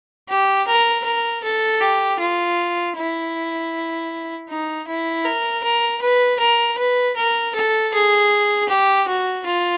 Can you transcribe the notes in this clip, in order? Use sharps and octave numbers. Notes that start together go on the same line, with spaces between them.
G4
A#4
A#4
A4
G4
F4
E4
D#4
E4
A#4
A#4
B4
A#4
B4
A#4
A4
G#4
G4
F#4
F4